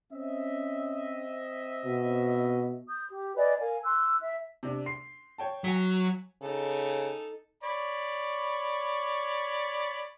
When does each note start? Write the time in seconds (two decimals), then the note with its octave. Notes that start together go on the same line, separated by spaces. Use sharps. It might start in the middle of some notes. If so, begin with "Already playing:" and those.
0.12 C4 C#4 D#5 E5
1.85 B2
2.87 D#6 G6
3.09 G4
3.36 B4 D5 D#5 G#5
3.59 A#4 F5 G#5
3.83 C6 E6 F#6
4.19 E5
4.63 C3 D4
4.86 C6 C7
5.38 C#5 G5 A5
5.64 F#3 G#5 B6
6.42 C#3 D#4 A4
7.64 C#5 D5 B5